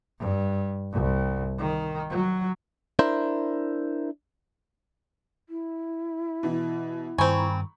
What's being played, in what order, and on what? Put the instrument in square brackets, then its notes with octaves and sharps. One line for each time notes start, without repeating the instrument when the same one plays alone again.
[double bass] G2
C2
D#3
F#3
[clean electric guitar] D4 E4 A#4 C5
[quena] E4
[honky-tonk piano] B2 E3
[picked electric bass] G2 D#3 [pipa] C4 G#5 [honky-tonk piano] A#5 B5 C#6